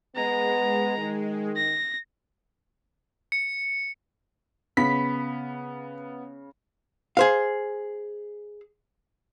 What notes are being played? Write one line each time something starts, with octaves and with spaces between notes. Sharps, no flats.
G#3 B3 A#5
D#3
A#6
C#7
C#3 B3 B5 B6
G#4 C5 F5